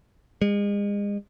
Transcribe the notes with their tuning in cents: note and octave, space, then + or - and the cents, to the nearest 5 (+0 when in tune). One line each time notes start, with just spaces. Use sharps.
G#3 -35